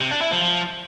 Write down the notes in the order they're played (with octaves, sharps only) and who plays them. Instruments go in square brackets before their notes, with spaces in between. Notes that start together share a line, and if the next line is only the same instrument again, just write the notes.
[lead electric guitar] C3
D4
E4
F3
F3